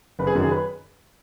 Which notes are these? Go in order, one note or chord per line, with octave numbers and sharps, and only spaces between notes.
F#1 B4
G#4
F#2 D#3 F#4
G#4
B4